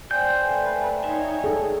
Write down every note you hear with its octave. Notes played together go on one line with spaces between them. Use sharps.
C5 D5 G5 G#5 G6
A3 B4
D#4 C#5 E5
G#4 A4